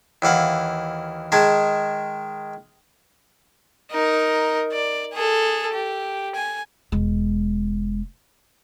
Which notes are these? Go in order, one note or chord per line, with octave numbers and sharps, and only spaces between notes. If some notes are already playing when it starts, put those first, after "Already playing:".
D#2 E3 F5 F#5
D#3 G#3 G#4 A5
D#4 A#4
D5
G#4 A4
G4
G#5
E1 G#3